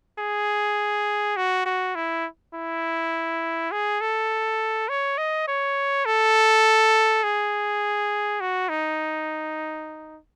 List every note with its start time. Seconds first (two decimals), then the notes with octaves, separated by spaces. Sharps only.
0.19 G#4
1.37 F#4
1.66 F#4
1.96 E4
2.54 E4
3.72 G#4
4.01 A4
4.89 C#5
5.18 D#5
5.48 C#5
6.06 A4
7.24 G#4
8.41 F#4
8.69 D#4